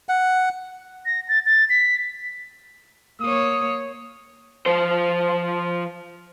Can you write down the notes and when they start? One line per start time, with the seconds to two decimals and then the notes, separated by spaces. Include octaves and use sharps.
0.09 F#5
1.06 A#6
1.29 A6
1.46 A6
1.69 B6
3.21 A#3 C#5 D#6
4.66 F3 C5